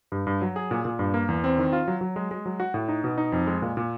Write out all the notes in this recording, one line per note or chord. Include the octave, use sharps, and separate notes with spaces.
G2
G2
F#3
G#4
A#2
A#2
G2
A#3
E2
C4
D#3
F4
F#3
F#3
G#3
G#3
F#3
F#4
A2
D#4
B2
D#4
F2
G#3
A#2
A#2